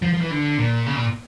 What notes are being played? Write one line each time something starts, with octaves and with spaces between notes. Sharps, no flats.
F3
F3
E3
D3
A#2
C#3
A#2